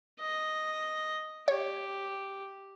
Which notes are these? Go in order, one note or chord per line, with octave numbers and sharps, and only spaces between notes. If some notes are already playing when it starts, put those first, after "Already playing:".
D#5
G4 C#5